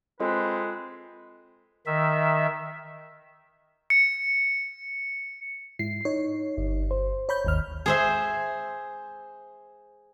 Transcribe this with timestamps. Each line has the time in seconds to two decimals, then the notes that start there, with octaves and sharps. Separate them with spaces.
0.20 G#3 C4 F4 A4 B4 D#5
1.86 D#3 E5
3.90 C#7
5.79 G#2 E4 C7
6.05 D#4 C#5
6.57 G1
6.91 C5
7.29 C#5 B5 G6
7.45 G#1 D#2 F6
7.86 G#4 C5 E5